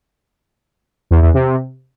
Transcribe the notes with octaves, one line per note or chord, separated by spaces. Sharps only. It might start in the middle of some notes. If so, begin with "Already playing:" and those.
E2
E2
C3